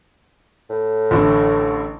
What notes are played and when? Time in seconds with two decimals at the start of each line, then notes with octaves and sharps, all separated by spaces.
0.70 A2
1.11 A1 D3 E4